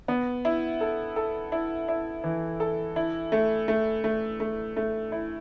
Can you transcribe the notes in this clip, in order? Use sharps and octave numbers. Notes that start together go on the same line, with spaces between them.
B3
E4
A4
A4
E4
E4
E3
A4
E4
A3
A3
A3
A3
A3
E4